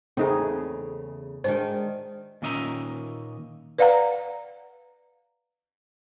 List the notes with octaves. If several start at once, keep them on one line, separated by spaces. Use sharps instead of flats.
E2 C#3 A3 C4 D#4 G#4
D#3 G#3 D4 C5
A#2 D#3 C#4 D#5 E5 A#5
B4 D5 F5 F#5 A#5